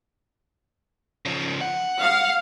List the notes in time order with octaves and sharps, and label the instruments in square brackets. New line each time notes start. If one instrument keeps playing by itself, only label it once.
[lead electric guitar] C#3 F3
F#5
[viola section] F5